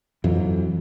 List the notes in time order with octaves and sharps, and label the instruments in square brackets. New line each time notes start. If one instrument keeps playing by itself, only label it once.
[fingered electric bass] F2 E3 F#3